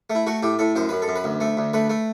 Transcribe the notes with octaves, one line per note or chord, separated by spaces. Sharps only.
A3
E4
A3 F#4
A2 G4
A2 A4
F#2 C5
F#2 B4
A4
F#2
B4
D2
A3
D2
A3 B4
A3